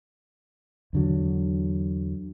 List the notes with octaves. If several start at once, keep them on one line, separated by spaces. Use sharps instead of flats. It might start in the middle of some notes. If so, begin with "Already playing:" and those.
E2 D3 F#3